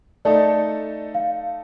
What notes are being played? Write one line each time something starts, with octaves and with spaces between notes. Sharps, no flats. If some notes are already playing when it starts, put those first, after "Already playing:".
A3 D#4 A4 D5
F5